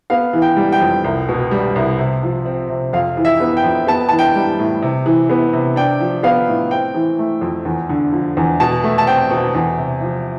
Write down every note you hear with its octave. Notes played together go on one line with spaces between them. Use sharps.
B3 F5
E3
G5
G3
G5
F2
C2
B2
G3
C2
C3
F3
C4
C3
F2 F5
E3
E5
B3
G5
F2
B3 A5
E3 A5
G5
G3
A2
C3
E3
B3
C3
D4 G5
F3
B3 F5
A2
C4 G5
E3
A3
F2
E2
D3
F3
E2
B2 A5
A3
A5
C4 G5
B2
E2
C3
F3